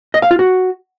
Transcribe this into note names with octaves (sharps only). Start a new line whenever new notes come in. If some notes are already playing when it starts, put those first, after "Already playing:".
D#5
F5
F4
F#4